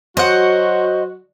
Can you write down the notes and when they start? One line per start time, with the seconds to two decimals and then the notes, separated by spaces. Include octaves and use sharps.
0.17 F#3 F#4 C5 D#5 F#5